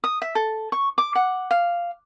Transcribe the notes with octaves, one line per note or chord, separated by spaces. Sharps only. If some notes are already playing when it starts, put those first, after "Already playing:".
D#6
E5
A4
C#6
D6
F#5
F5